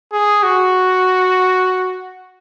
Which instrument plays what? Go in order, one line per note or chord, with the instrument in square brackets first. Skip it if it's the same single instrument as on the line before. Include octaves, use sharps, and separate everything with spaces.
[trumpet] G#4
F#4